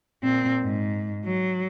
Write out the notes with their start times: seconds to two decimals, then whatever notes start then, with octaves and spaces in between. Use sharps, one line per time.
0.23 A#2 C4
0.61 G#2
1.25 F#3